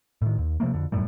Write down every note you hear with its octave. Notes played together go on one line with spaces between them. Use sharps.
A2 D#3
D#2
C3 F3 A3 A#3
F2 D3
E1 F#2 A2 G3